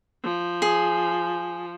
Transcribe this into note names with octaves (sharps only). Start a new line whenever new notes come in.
F3
G#4